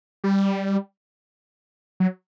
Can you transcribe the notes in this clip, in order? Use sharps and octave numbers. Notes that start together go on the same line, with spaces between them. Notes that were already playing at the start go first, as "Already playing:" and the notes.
G3
F#3